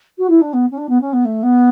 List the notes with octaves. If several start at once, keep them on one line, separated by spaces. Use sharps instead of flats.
F#4
E4
D4
B3
C#4
D4
B3
C#4
B3
A3
B3